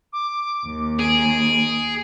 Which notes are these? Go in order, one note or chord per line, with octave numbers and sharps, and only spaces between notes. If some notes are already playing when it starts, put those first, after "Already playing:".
D6
D#2
G#4 D7